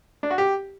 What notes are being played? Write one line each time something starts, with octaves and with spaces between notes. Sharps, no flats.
D4
F#4
G4